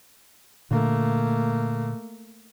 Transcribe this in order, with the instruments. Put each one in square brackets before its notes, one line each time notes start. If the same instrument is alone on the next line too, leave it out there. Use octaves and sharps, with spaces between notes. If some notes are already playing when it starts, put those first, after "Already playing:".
[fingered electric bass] A#2 D3 [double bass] A3 A#3